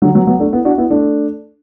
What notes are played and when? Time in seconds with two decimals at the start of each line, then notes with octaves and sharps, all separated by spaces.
0.02 D3 F#3
0.15 F#3 B3
0.27 F#3 B3
0.40 A3 D4
0.53 B3 E4
0.65 D4 F#4
0.78 B3 E4
0.90 A3 D4